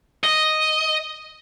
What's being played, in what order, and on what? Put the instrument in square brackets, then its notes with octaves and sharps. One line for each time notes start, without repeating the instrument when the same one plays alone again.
[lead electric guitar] D#5